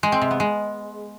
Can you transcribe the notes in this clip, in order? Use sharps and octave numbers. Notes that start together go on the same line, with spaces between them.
G#3
C4
C3
B3
G#3